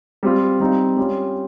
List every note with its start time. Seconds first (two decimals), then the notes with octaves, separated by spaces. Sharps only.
0.23 G3 C4 F4
0.60 G3 C4 D#4
0.97 G3 C#4 F4